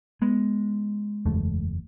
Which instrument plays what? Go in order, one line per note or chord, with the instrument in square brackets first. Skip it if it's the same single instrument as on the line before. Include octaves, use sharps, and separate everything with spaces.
[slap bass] G#3 [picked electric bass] B3
[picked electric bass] F#1 E2 A3